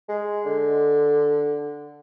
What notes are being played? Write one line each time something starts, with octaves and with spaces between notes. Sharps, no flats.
G#3
D3